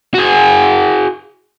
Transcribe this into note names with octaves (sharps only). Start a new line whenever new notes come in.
F#4 G#4